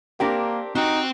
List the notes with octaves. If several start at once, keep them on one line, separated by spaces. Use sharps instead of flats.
A#3 C4 D4 G4 A#4
C4 D#4 F#4 G5